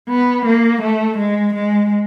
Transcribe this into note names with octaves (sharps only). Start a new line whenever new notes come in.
B3
A#3
A3
G#3
G#3